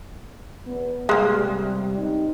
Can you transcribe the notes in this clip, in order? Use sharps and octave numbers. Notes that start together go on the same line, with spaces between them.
E2 B3
C3 G3 G#3 A#3
C4 D#4